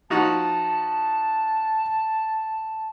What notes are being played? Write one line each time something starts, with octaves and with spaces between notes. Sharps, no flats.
F3 D#4 F#4 A5